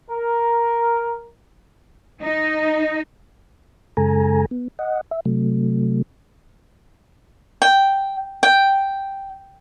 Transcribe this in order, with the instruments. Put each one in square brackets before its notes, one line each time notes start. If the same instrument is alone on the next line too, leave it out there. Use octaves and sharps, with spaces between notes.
[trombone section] A#4
[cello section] D#4
[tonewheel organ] F#2 C#3 G#3 A4 G#5 A#5
B3
D#5 F#5
E5
C3 F#3 A3
[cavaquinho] G5
G5